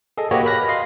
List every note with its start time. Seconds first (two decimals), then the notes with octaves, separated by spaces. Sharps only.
0.18 G#4 A4 D#5
0.31 A#3 F#4 G4 B4 C#5 D#5
0.46 B5 F6 F#6 A#6
0.68 D#5 F5 C6